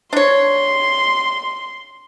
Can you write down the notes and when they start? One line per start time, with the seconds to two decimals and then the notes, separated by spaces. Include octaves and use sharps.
0.13 D4 C#5 C6